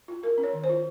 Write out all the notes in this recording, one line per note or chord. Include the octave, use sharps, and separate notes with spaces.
F4
F4 A#4
C#4
C#5
D#3
C5
F4